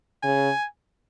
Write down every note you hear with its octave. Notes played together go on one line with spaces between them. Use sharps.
C#3 G#5